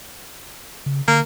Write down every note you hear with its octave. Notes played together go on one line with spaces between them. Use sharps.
C#3
D3 A#3